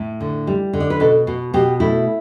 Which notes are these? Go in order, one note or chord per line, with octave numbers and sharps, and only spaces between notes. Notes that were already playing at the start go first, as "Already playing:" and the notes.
Already playing: A2
D3
G3
D3
D5
B4
B2 A4
B2
B2 G4
A3 E4